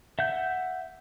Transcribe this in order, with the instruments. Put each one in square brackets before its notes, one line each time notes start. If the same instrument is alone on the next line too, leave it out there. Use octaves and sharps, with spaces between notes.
[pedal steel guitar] E5 F#5 G6